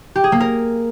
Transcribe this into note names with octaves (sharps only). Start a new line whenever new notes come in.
G4
G#4
A#3
A#4